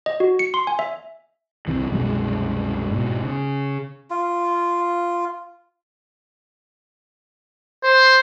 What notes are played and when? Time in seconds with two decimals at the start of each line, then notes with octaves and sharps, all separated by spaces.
0.06 D#5
0.20 F#4
0.39 C#7
0.54 C6
0.67 G#5
0.79 E5
1.68 C2 C3 E3
1.91 C2 F#2 B2 G#3
2.91 G#2 B2
3.24 C#3
4.10 F4
7.84 C5